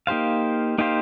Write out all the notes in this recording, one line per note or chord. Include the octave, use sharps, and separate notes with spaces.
A#3 D#4 G4 C5 F5
A#3 D#4 G4 C5 F5